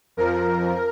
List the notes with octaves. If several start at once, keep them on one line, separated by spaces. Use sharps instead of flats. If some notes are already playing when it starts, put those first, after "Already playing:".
F2 F3 A#4